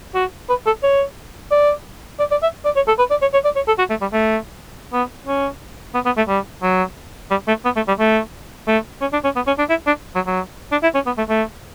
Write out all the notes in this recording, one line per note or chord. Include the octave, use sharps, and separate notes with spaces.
F#4
B4
A4
C#5
D5
D5
D5
E5
D5
C#5
A4
B4
D5
C#5
C#5
D5
C#5
A4
F#4
A3
G3
A3
B3
C#4
B3
B3
A3
G3
F#3
G3
A3
B3
A3
G3
A3
A3
C#4
D4
C#4
B3
C#4
D4
E4
D4
F#3
F#3
D4
E4
C#4
B3
A3
A3